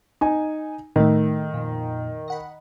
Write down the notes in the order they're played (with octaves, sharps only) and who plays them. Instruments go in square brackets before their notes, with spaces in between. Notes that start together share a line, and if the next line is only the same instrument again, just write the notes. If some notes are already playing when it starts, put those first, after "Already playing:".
[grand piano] D#4 G#5
[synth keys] A2 A3 [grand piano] D#3
[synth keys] F2 A#2
D#5 F#5 B5